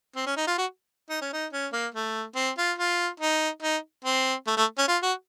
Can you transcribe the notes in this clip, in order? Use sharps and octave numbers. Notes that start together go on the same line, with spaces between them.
C4
C#4
D#4
F4
F#4
D#4
C#4
D#4
C#4
A#3
A3
C4
F4
F4
D#4
D#4
C4
A3
A3
C#4
F4
F#4